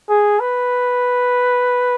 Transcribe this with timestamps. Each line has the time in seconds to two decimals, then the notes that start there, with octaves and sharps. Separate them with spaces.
0.09 G#4
0.40 B4